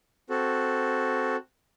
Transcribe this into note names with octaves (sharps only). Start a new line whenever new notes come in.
C4 F#4 A4